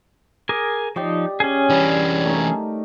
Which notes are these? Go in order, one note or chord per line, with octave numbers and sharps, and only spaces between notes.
G#4 A#4 D6
F3 D#4 G4 D5 D#5
C#3 C#4 G#4
E3 G3 D4
A3 D#4 A#4